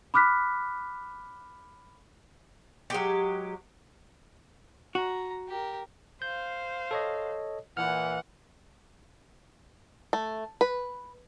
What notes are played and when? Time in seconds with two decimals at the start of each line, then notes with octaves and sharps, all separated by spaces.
0.14 B5 D6 F6 F#6 B6
2.90 F#3 G#3 G4
4.95 F#4 A#5
5.48 G4 A#4
6.22 C5 F5 G6
6.91 A4 C#5 D#5
7.77 A#2 E3 F#5 F6
10.13 A3
10.61 B4